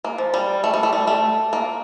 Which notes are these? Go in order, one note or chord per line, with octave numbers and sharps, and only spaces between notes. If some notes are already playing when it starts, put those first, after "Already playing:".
A#3
F3
G3
A3
G3
A3
G3
A3
A#3